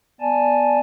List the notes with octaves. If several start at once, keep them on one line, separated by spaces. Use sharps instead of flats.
B3 D5 G#5 A5